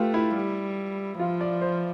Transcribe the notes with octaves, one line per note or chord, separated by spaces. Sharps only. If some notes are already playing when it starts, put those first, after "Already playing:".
Already playing: A3 F4 G4 B4
E4
G3
F3 F4
D5
C5